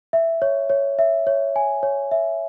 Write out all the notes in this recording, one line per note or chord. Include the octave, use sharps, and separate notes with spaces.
E5
C#5
C#5
E5
C#5
G#5
C#5
E5